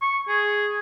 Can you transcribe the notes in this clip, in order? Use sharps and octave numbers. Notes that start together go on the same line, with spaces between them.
C#6
G#4